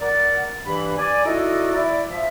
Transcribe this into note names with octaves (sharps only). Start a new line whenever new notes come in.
A#4 D5 F#5
G2 E3 B5
D5 G#5
D#4 E4 F#4 A4 D5 D#5
E4 D5
F3 E5